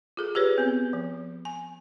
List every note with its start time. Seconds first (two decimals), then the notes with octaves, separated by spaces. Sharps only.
0.17 F4 G#4 A4
0.35 G4 G#4 B4 C#5
0.58 B3 C4
0.93 F3
1.45 G#5